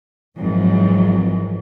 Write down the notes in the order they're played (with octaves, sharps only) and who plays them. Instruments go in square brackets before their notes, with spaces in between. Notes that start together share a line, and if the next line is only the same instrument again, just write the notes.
[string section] G#1 F2 G#2 E3 F#3